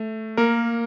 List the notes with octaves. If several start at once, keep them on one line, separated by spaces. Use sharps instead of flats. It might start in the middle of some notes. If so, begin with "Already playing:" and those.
Already playing: A3
A#3 A#4